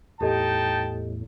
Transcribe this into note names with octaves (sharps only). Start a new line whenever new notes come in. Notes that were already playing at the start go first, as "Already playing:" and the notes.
E2 A2 D#4 G4 A4 D#5 G5 A5